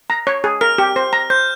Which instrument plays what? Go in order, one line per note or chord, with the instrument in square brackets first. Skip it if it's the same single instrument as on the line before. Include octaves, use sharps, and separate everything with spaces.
[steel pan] A#5
C#5
G#4
[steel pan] A#4 [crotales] F6
[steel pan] G4
C5
A#5
[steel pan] C5 [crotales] G6